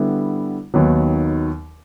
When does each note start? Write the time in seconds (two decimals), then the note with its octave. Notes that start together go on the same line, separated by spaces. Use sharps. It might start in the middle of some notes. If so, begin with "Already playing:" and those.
Already playing: D3 G3 B3 E4
0.74 D#2 D#3 F#3 B3